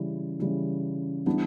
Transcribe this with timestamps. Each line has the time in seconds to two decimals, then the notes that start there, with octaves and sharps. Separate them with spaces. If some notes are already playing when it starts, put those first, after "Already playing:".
Already playing: C#3 E3 G3
0.40 C#3 E3 G3
1.26 E3 G3 B3 D4